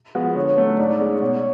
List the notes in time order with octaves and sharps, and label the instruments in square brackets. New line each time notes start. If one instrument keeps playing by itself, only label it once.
[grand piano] F3 G#3 B3 F#4
[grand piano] D3 [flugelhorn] C#5
[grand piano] F#3 A3 C#4
[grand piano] G#2 [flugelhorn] D5
[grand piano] G#3 C#4
[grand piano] B2 [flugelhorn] C#5